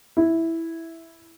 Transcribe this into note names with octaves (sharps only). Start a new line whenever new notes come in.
E4